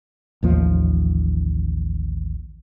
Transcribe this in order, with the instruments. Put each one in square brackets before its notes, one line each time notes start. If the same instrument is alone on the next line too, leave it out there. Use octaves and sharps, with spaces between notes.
[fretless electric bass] A1 D#2 F3